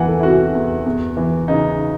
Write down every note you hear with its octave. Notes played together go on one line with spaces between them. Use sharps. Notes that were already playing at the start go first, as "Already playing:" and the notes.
Already playing: E2 E3 F#5 G#5
A4
E4
C3 F#4
E2
E2
E3
C#3 D#4